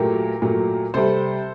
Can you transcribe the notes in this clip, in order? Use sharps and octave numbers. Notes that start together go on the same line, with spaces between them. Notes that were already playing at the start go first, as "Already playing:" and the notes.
Already playing: A#2 F#3 A3 G4 A#4
A#2 F#3 A3
C3 G3 A4 C5